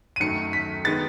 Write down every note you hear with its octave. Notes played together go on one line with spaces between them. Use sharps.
D#7
F#2 D#3 F#3 A3 C#7
B6
D#3 G#3 B3 A6